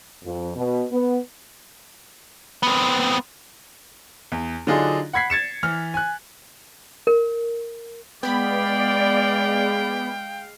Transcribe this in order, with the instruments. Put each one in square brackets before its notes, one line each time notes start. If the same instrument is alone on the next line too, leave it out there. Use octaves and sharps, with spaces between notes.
[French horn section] F2
B2
B3
[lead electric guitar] B3 C4
[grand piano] E2
D3 F#3 D4 D#4 F4 G#4
F#5 B5 G#6 B6 C7
G#6 A6 C#7 E7
E3 F6
G#5 F#6
[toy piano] A#4
[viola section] G#3 F5 [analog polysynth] B3 B5 [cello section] D5 [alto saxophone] G5